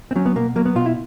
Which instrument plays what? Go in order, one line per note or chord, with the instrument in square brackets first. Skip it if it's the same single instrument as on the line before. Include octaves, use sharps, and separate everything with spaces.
[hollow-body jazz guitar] C4
F#3 C#4
B3
B2 A#3
F#3 A#3
B3
B2 F4
E4